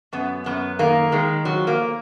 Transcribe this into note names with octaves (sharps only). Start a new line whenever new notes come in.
F#2 B3
F#2 B3
D#3 A#3
D#3 G#3
F3 F#3
A#3